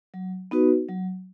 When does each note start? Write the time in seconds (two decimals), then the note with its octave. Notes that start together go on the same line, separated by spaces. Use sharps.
0.14 F#3
0.51 B3 D#4 F#4 B4
0.89 F#3